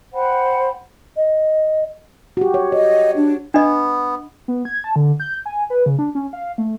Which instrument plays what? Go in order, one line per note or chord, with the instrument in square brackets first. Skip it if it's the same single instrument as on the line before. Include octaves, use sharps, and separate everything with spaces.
[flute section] C5 F#5 G5 B5
[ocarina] D#5
[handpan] F#4 G4
C#5
[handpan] C#5 [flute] D#5
[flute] D4
[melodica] B3 [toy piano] D4 D#5
[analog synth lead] B3
G#6
A5
D3
G6
G#5
B4
C#3
D4
C#4
F5
A3